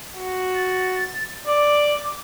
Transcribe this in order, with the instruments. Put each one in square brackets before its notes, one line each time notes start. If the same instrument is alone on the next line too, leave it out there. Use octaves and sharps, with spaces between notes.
[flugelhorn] F#4
[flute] A6
[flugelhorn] D5 [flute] D6